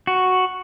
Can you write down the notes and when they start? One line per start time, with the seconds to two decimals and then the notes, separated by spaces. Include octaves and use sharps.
0.07 F#4